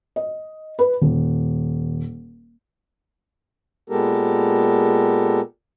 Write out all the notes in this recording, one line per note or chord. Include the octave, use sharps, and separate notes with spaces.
D#5
B4
D#1
A#2 G#3 B3 G4 A4 A#4